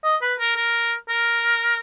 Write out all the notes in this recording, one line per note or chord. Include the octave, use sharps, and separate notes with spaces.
D#5
B4
A#4
A#4
A#4